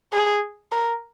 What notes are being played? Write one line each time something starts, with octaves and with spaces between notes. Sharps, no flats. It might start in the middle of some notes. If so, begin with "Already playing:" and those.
G#4
A#4